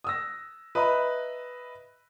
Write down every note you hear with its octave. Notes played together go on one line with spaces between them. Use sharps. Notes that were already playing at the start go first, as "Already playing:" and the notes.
D#6 E6 A#6
B4 D#5 E5 A#5 B5